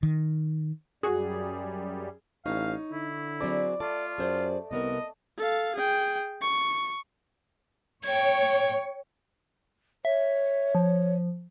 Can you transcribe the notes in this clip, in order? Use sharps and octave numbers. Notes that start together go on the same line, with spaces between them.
D#3
F#2 G3 F#4 G#4
A1 D#4 C#5 F5
D3 E4
F#3 C4 G#4 D5 B5
A3 F4 D5
F#2 G#4 C5 D5
C2 C3 B3 A#4 D#5
A4 F5
G#4 G5
C#6
C#5 G5 G#6
C#5 E5
F3